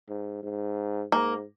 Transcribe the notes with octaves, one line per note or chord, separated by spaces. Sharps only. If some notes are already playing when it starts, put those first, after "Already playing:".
G#2
G#2
G#2 A#3